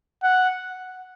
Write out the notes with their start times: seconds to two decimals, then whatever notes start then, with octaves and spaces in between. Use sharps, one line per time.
0.23 F#5